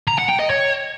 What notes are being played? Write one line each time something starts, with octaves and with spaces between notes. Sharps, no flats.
A#5
F#5
G5
D#5
C#5